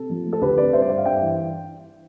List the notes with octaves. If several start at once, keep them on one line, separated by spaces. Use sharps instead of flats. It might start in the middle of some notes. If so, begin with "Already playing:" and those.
Already playing: C3 A4
F3
A3
A4
D2 G4 B4
C3 B4 D5
G3 C5 E5
D5
G2 E5
F5
G2 E5 G5
E3